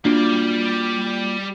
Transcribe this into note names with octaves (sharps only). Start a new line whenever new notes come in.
G3 A#3 D4 F4 F#4 D5